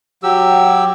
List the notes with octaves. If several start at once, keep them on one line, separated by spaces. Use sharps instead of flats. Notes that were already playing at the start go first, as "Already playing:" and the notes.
F#3 G4 E6